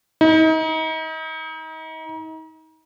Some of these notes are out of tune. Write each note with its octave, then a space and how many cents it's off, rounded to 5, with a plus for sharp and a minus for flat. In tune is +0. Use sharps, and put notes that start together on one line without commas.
D#4 +35